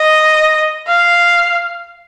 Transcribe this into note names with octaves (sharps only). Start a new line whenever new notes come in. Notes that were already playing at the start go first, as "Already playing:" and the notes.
Already playing: D#5
F5